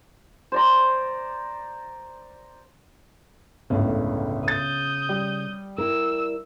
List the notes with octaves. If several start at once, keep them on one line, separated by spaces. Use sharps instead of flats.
C5 D5 A#5
G1 C#2 A2 C#3
D#6 G6 A6
G3
E4 A#4 E6